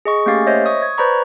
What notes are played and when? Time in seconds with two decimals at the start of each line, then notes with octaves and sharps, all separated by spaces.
0.05 G#4 D#5 C#6
0.26 A3 A#3 C#4 G4 F5 A6
0.46 C5 C#5 D#5 E5
0.66 C#6 D#6
0.82 G#6
0.98 B4 C5 D5 A#5 B5 C#6